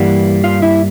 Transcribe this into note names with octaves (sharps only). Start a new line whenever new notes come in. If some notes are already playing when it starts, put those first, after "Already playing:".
Already playing: G2 E3 G3 A#3 F#5
F4 F5
E4 E5